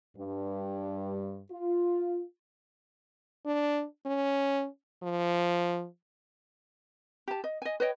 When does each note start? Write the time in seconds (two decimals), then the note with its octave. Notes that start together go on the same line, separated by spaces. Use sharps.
0.17 G2
1.51 F4
3.46 D4
4.06 C#4
5.03 F3
7.28 G4 A5
7.44 D#5
7.62 D#5 G#5
7.80 B4 C#5 D#5 G5